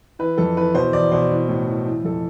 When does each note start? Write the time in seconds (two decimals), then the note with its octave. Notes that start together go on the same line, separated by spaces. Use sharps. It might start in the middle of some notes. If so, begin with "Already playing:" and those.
0.19 E3 B4
0.38 F2 A4
0.57 E3 B4
0.75 B2 C5
0.93 E2 D5
1.12 B2 C5
1.30 E3
1.49 A2
1.67 E3
1.86 E3
2.04 F2 A4